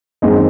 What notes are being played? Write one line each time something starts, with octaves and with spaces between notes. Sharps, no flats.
F#1 F#2 D#3 G#3 C4 D#5